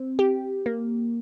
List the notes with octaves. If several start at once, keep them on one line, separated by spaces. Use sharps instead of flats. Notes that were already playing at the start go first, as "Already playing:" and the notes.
Already playing: C4
G4
A#3